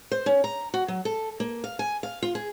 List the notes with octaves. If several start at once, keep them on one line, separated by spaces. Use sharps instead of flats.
C5
C#4
A#5
F#4
F#3
A4
A#3
F5
G#5
F5
F4
G#4